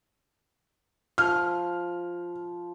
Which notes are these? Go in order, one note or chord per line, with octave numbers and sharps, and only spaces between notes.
F3 F6